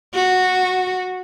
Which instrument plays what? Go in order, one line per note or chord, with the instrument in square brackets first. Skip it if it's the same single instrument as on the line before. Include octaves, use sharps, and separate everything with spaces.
[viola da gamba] F#4